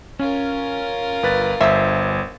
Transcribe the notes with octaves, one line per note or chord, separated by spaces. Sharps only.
C#4 F4 A#4
G1 B4 A6
G1 A4 C5 E5